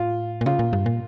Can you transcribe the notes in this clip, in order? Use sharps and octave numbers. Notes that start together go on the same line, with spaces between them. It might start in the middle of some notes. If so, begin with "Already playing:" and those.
Already playing: A2 F4
A#2
C#3 F4
A#2
G2
A#2